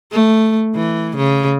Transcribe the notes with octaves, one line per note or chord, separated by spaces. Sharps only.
A3
E3
C#3